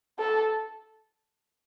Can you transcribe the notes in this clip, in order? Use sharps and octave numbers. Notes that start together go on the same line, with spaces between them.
A4